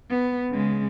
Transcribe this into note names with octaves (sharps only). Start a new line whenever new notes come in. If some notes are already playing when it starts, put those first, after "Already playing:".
B3
C#3 G#3